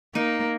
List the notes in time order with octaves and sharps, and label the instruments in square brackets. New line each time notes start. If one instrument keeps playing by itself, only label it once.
[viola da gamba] A#3 [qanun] D#4